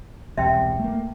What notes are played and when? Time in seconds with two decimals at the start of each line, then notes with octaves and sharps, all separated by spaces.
0.38 E1 C2 C3 E5 G5
0.80 A3 A#3